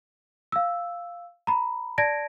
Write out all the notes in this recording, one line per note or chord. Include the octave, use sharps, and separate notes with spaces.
F5 E6
A#5 B5
D5 A5 G#6 A#6 D7